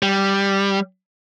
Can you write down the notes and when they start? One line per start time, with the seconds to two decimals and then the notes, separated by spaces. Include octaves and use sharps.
0.03 G3